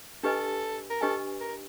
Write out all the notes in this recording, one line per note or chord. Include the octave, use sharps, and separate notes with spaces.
D4 G4 A4 B4 D#5 G#5
A#4
D4 G4 A4 B4 D#5 G#5
A#4